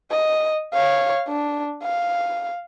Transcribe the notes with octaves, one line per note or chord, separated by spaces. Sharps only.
D#5
C#5 F5
D4
F5